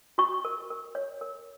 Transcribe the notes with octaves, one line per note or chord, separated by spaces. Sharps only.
F#4 C#6
A#4
A#4
C#5
A#4